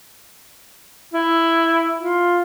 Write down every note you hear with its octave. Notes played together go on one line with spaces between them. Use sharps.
E4
F4